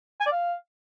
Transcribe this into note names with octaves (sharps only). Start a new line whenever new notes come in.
G#5
D5
F5